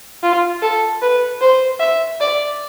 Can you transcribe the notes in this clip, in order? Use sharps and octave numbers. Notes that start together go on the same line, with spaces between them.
F4
A4
B4
C5
E5
D5